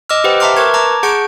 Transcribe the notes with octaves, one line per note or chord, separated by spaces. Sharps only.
D#5 D6 E6 F6
G4 B4 C5 F#5 G5
E5 A5 A#5 C6 D6 F6
A#4 B4 C#6 G#6
A5 A#5 D6 G#6
G#4 F#5 A5 C#6 G6 D7